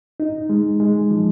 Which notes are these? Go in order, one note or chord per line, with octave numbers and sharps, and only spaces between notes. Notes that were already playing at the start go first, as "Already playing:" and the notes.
D#4
G#3
G#3
F3